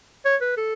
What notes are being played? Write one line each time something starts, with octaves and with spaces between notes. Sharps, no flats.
C#5
B4
A4